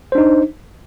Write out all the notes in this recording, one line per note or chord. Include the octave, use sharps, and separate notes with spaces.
D4 D#4 C5